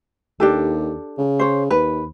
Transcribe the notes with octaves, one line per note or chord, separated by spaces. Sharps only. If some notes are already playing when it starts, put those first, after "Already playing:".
D#2 D4 G4 A4
C#3
C5 C#5
D#2 B4